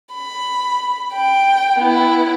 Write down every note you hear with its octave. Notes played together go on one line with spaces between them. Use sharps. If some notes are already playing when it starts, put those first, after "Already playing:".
B5
G5
B3 E4